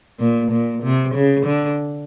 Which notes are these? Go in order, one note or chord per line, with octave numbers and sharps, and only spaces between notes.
A#2
A#2
C3
C#3
D3